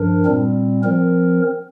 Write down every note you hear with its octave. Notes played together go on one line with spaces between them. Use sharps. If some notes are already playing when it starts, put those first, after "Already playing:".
Already playing: G2 F3 D4 A#4
A#2 G3 C4
F3 C4 A#4